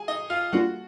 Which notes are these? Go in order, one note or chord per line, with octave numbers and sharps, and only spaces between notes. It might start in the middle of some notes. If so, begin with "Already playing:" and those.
Already playing: G#4 G#5
D#4 D#5
F4 F5
G3 A#3 D4 F4 F#4 F#5